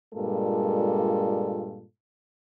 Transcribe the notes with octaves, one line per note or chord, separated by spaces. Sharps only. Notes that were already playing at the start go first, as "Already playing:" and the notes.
G2 A#2 G#3 A#3 F4 A4